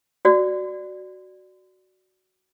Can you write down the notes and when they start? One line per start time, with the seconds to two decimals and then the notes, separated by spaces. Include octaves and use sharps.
0.25 F#4 D5